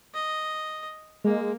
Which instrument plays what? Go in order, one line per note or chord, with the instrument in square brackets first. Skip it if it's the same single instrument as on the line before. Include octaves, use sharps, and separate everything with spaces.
[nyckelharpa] D#5
[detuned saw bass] G#3 [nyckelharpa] A#3